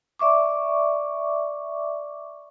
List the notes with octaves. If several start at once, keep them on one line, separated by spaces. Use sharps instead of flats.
D5 E5 C#6 D6